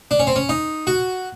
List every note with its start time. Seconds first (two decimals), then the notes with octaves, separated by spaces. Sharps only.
0.11 D4
0.19 C#4
0.27 C4
0.36 C#4
0.49 D#4
0.87 F#4